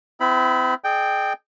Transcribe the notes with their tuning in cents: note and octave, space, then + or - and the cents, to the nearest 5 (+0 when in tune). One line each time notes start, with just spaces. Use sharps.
C4 -35 E4 +25 B5 +0
G#4 +30 D#5 -45 G5 +0